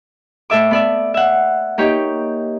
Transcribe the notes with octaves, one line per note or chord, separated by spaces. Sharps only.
A2 A4 E5 D6
B3 D5 E5
E5 F#5
A#3 D#4 G4 C#5